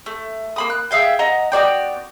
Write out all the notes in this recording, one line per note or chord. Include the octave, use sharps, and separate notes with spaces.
A3
A#3 B5 D#6
F#6
G#4 E5 F5 G5
D#5 F#5 A#5
B3 F#4 D5 G5